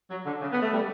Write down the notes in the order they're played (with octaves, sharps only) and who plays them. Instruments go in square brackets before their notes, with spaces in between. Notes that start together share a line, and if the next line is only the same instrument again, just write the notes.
[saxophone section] F#3
D3
C#3
B3
A3
G3